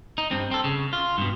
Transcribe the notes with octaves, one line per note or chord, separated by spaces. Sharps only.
D#4
G2 C4
C4 A4
C#3
F4
G2 B2